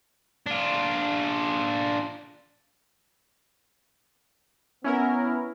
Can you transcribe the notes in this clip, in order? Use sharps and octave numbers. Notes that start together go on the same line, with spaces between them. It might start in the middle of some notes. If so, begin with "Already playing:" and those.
D4 F4
B3 C#4 E4 A#4